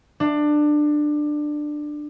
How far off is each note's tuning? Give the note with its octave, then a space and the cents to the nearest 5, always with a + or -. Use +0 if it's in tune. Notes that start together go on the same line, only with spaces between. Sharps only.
D4 +20